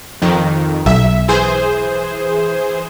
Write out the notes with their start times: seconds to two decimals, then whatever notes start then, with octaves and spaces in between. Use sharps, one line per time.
0.22 F2 D#3
0.86 B1 E5
1.28 E3 G#4 C5